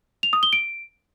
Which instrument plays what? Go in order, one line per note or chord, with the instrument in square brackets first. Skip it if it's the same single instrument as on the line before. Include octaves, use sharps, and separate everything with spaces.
[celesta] F7
D#6
G7
D7